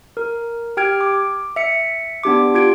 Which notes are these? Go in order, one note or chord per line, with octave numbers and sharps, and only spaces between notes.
A#4
G4 G5 F6 G#6 D7
D6
E5 C#7
B3 D4 G4 D6
F4 G4 G#6 D7